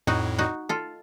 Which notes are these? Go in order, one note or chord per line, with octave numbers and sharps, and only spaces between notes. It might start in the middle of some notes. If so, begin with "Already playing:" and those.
F2 A2 D#4 F#4
D#4 F#4
F4 A4